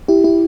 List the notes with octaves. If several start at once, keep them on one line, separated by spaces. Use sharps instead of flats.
E4 G4
E4 G4